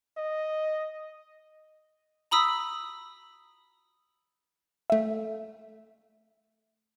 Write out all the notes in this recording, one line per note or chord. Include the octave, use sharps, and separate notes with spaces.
D#5
A#5 B5 D#6 E6 B6
A3 E5